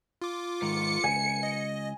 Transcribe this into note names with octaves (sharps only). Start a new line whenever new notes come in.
F4 D6
G#2 D#3 C#7
C#2 G#5
D#5